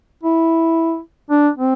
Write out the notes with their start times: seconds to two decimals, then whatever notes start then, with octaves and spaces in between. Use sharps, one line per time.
0.24 E4
1.30 D4
1.58 C4